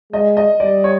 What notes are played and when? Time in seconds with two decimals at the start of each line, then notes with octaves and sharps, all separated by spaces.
0.13 G#3 D#5
0.37 D#5
0.60 G3 D5
0.84 C#5